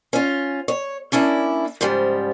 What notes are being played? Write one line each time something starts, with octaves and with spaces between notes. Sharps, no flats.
C#4 F4
C#5
A#3 C#4 D4 E4
G#2 C#3 F3 G3